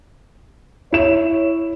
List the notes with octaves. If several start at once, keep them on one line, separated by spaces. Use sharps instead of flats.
E4 C#5 E7